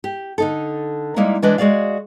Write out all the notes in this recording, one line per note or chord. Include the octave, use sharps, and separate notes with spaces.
G4
D3 D#4 A4
G3 G#3 A#3 D#4 E4
E3 G#3 D4 B4 D#5
G#3 F#4 G#4 D5 F5